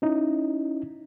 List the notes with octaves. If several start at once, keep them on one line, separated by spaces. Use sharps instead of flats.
C#4 D#4 E4